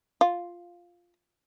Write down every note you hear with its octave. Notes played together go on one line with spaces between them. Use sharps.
F4